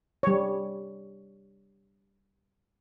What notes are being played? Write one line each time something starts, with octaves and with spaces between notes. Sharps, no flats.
G3 C#5